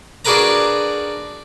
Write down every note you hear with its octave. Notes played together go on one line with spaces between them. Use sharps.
D4 F#4 G#4 A#4 B4 A#5